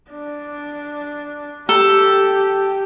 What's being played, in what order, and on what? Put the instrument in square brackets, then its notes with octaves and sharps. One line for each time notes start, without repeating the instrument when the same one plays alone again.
[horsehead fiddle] D4
[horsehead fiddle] G4 [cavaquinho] A4